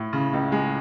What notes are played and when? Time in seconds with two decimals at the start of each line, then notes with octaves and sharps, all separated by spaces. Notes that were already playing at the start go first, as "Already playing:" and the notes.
Already playing: A2
0.13 C#3
0.33 C#2
0.52 G#3